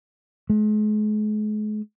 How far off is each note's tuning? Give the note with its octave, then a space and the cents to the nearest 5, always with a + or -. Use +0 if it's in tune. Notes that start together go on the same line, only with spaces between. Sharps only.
G#3 +40